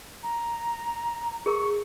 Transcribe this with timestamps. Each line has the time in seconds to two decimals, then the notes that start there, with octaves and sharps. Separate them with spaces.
0.23 A#5
1.46 G#4 A#4 C#6